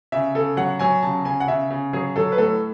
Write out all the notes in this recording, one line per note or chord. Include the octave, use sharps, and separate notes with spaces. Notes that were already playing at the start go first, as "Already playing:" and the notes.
C#3 E5
C#3 A4
F#3 F#5
F#3 G#5
C#3 A5
C#3 G#5
F#5
C#3 E5
C#3
F#3 G#4
F#3 A4
B4
A2 A4